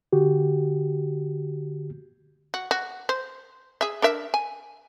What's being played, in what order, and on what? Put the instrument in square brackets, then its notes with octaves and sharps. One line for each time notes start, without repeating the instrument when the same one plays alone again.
[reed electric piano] D3 F#4 G4
[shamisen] F#4
F#4
C5
G#4 E5
D4 A#4 E5
G#5